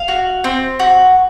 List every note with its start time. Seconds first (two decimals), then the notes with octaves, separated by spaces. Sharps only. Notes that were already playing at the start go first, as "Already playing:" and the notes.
Already playing: F5
0.08 F#4
0.44 C4
0.80 F#4